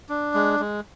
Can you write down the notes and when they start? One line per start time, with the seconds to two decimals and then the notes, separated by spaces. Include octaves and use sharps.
0.09 D4
0.34 G#3
0.60 G#3